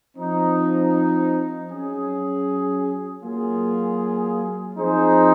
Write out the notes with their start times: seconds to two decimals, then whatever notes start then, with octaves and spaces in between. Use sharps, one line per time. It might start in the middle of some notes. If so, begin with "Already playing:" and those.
0.17 F3 C4 D#4
1.70 F#3 C#4 G#4
3.23 F#3 A#3 F4 G#4
4.76 F3 C4 D#4 G#4 C5